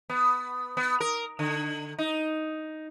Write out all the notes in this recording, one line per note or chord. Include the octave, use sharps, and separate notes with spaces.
B3
B3
A#4
D3
D#4